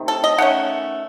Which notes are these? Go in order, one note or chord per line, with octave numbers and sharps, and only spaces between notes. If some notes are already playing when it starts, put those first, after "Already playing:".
Already playing: C3 D#3 A3
A4
D#5
D#3 A3 C#4 F#5